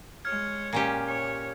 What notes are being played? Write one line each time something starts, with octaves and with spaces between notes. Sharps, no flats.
G#3 C#5 F6 G#6
A#2 C#4 G4
C#5